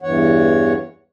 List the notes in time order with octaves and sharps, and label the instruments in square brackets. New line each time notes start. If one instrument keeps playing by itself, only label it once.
[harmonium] E2 G2 E3 C#5 F#5